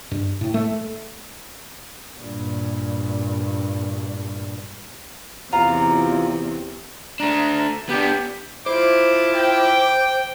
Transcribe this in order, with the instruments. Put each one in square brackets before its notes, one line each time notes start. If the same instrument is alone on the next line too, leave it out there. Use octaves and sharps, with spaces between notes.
[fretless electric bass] G2
A2
A3
[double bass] G2 A#2
[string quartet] E2 C3 [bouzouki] F4 A#5
[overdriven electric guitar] A3 D4 [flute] A#5
[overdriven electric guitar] B3 D4 [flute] G4
[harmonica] F3 E4 [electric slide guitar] C5 [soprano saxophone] D6
[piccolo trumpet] G5